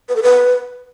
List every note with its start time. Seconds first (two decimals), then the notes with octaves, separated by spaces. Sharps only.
0.09 B4
0.16 A4
0.23 B4